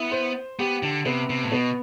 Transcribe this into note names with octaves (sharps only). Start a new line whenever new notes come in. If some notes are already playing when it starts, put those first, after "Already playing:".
Already playing: B3 E4
C5
B3 G4
D3
C3 B3
C3
A2
B2 B3